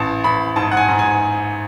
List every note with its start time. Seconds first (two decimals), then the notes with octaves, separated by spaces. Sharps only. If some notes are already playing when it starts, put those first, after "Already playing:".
Already playing: A1 A5
0.24 A1 B5
0.56 G#2 A5
0.71 F#5
0.77 G#5
0.88 G#2
0.99 G#5